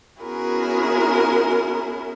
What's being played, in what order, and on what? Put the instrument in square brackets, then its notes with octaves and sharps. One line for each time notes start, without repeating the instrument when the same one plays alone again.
[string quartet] B3 C#4 E4 F#4 G#4 A#4